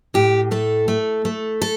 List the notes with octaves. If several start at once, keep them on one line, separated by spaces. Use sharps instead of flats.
A2 G4
A3 A4
A3
A3
A4